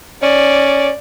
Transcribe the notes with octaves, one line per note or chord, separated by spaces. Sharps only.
C#4 D5